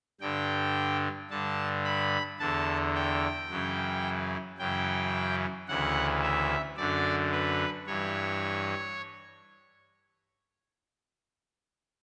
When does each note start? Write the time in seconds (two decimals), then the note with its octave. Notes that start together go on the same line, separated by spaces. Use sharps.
0.21 G2 D3 G5
1.30 G2 D3 A5
1.85 B5
2.39 E2 D3 A5
2.95 G5
3.49 F#2 C#3 E3
4.58 F#2 C#3 E3 G5
5.68 D2 C#3 E3 F#5
6.23 E5
6.77 F#2 D3 D5
7.32 B4
7.87 G2 E3 C#5